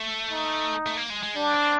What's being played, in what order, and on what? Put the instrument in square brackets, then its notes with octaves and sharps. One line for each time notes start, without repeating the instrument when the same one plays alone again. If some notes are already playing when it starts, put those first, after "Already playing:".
Already playing: [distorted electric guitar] A3
[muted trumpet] D#4
[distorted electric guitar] A3
A#3
G#3
G#3
[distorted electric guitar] G3 [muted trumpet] D4
[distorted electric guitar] C4